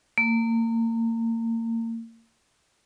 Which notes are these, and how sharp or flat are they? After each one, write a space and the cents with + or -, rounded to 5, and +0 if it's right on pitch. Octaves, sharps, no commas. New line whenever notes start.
A#3 -35